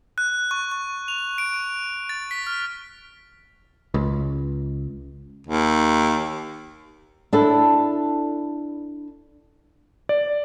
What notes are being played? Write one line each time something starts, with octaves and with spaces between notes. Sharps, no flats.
F#6
C#6
C#6
F7
D7
A6
B6
F6
C#2
D#2
D4 E4 A4
D5